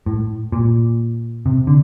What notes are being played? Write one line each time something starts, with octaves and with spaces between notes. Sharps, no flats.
A2
A#2
C3
D3